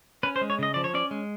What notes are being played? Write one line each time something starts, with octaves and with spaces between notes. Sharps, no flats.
C#4 B4
C5
G#3
C#5
C#3 D#5
F3 D5
C#5
C#4 D5
G#3